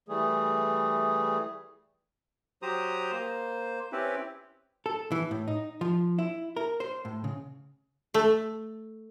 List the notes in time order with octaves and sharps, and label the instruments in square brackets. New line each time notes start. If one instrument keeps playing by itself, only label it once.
[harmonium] E3 G3 A3 G#4
[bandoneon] F#3 G4 C5 A#5 D#6
A#3 C5
C4 C#4 E4 G4 B4
[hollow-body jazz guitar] A4
E3
A2
D#4
F3
E4
A#4
C5
A2
C#3
[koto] A3